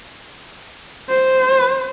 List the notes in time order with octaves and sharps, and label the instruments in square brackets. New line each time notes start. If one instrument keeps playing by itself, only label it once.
[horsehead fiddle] C5